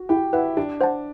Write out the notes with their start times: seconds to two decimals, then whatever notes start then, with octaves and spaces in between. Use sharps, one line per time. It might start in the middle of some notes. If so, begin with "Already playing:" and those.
Already playing: F#4
0.09 E4 G4
0.33 E4 B4 F#5
0.57 D4 G4
0.81 C5 F#5 A5